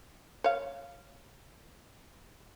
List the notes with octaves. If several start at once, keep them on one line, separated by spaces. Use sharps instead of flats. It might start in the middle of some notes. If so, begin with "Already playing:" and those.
C#5 F5